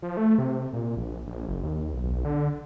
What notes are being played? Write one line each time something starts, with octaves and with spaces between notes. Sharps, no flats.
F3
A3
C3
A#2
A#1
A#1
F#1
D#2
B1
D3